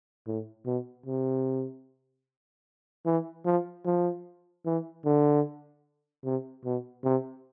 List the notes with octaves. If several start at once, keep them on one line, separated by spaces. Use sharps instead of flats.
A2
B2
C3
E3
F3
F3
E3
D3
C3
B2
C3